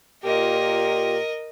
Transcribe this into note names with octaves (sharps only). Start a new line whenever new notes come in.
A#2 F4 G4 A#4 D#5